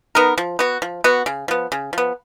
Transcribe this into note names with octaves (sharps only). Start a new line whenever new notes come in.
B3 D#4 A#4
F3
B3 F#4
F3
B3 F#4
C#3
F3 B3
C#3
F3 B3